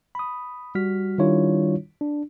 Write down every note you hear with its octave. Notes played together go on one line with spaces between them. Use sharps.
B5 D#6
G3 F#4 F6 B6
D#3 G3 D4 E4 F4 C#5
D4